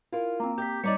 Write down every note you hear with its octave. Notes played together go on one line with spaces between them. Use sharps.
E4 F4 A#4
A#3 C4 A#5
G4 G6 B6
G3 D4 D#4 C#5 D5 D6 C#7